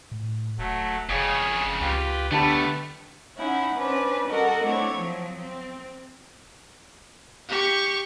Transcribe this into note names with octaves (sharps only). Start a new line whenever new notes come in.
A2
D#1 F#3 A3
F#1 F2 C#3 G#4 C#5 E5
C#2 F4 G4 B4
D3 G3 A3 B3 D4 A5 B5
C#4 D#4 E4 F#5
C#4 D4 B4 C5
G3 F#4 A4 A#4 D#5 F#5
A3 C4 D4 E4 C#5
F3 F#3 C4
C4
G4 C#6